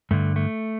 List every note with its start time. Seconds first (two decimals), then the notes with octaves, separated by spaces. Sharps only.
0.11 G2 D3 A3
0.36 A3